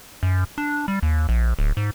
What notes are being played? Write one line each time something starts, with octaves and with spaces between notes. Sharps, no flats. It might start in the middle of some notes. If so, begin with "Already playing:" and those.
F#2
D4
G3
D#2
A#1
D1
G#2